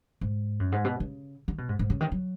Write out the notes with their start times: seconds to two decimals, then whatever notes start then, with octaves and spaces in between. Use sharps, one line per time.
0.21 G#2
0.60 F#2
0.72 G#2
0.85 B2
1.00 C#3
1.48 D#3
1.58 B2
1.69 G#2
1.79 G#2
1.90 C#3
2.01 D#3
2.12 F#3